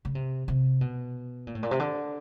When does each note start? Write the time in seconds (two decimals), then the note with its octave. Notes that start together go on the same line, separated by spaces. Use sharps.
0.05 C#3
0.15 C3
0.48 C3
0.81 B2
1.47 A#2
1.55 A2
1.63 A#2
1.71 C3
1.80 D3